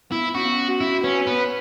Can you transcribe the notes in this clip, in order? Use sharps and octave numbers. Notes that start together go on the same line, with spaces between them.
B3 E4
C#4 F#4
B3
C#4
F#4
C#4 E4
F#4
C#4 B4
C#5
B3 B4